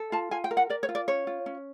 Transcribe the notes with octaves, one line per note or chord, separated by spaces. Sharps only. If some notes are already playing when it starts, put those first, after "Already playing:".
Already playing: A4
F4 A5
F4 G#5
G5
A#4
F#5
A#4 D5
C#5
F4
D5
C#4 C#5
F4
C#4